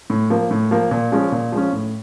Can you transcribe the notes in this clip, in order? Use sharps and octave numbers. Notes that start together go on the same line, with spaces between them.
A2
F3 A#3
A2
F3 A#3
A#2
F3 G#3 C#4
A#2
F3 G#3 C#4
A2